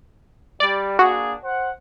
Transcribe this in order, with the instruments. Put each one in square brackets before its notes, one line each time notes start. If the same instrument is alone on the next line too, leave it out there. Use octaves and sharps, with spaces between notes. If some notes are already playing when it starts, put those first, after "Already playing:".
[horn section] G3 [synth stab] D5
[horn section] A#3 D4 G#4 [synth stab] F#4
[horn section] C5 F#5